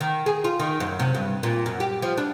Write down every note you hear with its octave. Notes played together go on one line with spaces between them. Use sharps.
D#3
G#4
F4
D#3
F#2
C3
G2
A#2
F#2
G4
F3
D4